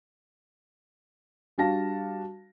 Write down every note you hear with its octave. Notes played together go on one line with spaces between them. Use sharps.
G3 D4 F#4 F5 A5 A#6